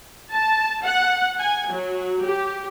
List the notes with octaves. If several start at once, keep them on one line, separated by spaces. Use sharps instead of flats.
A5
F#5
G#5
F#3
G4